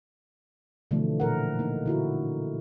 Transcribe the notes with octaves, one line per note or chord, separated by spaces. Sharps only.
B2 D3 E3 F3 A3
A#2 A#4 F#5
A#3 D#4
D3 E4 F#4